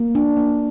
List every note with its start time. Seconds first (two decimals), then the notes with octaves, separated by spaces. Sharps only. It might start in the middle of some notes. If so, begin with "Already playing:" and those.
Already playing: A#3
0.15 D4
0.37 A#3